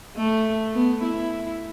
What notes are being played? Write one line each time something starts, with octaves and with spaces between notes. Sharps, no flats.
A3
B3
E4